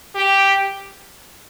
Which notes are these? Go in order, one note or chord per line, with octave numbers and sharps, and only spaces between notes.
G4